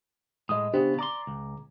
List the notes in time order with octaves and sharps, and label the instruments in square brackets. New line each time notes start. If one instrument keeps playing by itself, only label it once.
[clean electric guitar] A2 G#3 [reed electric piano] D#5 D#6
[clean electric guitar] C#3 B3 [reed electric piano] D4 G4 C5
[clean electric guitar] D5 C6 [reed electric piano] A#5 D6
[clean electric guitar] C#2